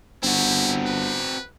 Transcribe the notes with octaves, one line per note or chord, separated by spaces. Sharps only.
G1 C4 E4 F#4
B4